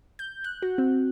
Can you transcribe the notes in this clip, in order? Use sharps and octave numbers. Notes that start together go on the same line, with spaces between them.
G6
F#6
F#4
C4